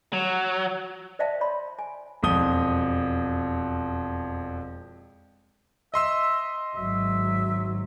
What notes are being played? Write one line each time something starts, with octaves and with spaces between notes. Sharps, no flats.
F#3
C5 D5 E5 F5 G5 A5
C#5 D5 B5 C6
G#5
E1 F2 D#6 G7
D#5 E5 C6 E6
G#1 F#3 E5